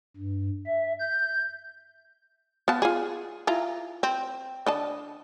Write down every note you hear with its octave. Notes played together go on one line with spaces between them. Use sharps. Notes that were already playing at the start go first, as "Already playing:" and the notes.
G2
E5
G6
B3 F5 A5
F4 G#4
E4 F4 A#5
C4
D3 D#5 A5